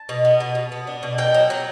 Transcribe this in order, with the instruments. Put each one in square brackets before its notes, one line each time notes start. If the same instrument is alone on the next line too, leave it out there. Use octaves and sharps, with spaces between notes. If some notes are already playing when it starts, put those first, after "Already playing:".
Already playing: [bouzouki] A5
B2
B3
B2
B2
B3
D4
B2
B2 G5
F#3
F#3